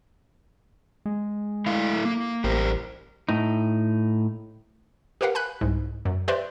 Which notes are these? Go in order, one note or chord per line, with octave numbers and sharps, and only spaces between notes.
G#3
A3 E4 F5
A#3
A1 G4 A#4 C5
A2 D#4
G4 A#4 B4 F5 F#5
G#5 B5 F#6
C2 G#2
F#2
G4 B4 C5 D5 E5 C6